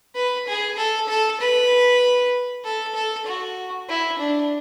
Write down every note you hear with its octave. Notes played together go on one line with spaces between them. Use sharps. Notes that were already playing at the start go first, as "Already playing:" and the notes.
B4
G#4
A4
A4
B4
A4
A4
F#4
E4
D4